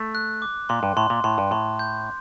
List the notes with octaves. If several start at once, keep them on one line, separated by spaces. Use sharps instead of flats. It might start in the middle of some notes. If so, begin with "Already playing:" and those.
Already playing: A3
F#6
D6
A#2 C6
G2
A2 C6
A#2
A2 C6
G2
A2 C6
G6